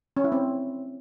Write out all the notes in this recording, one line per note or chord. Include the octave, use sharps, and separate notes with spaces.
C#4
E4
C4